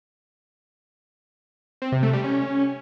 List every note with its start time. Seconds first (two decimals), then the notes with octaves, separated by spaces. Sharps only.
1.82 C4
1.92 C3
2.03 A3
2.13 G3
2.24 C#4